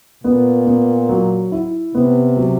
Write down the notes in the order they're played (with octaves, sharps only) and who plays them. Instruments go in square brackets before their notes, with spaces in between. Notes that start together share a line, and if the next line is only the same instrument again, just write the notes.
[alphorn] A#2 [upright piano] B3
[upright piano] B3
F#3
E4
[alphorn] C3 [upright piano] B3
[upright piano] F#3